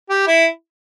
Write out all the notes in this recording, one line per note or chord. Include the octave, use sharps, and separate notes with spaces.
G4
E4